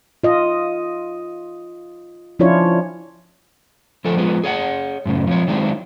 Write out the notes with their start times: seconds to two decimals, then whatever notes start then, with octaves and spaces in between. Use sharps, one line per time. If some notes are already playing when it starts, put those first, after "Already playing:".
0.24 F4 D#5
2.39 F3 C#4 D4 E4 F4 C#5
4.05 D3 F3 A4 G#5
4.17 F3 G#3 B3
4.44 G#4 C#5 F5 F#5
5.05 F#2 A2 C#3
5.27 F3 C4 C#5
5.48 D#3 F#3 G#3 C4 D4 E4